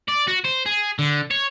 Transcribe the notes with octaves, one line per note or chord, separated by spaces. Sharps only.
D5
F#4
C5
G#4
D3
C#5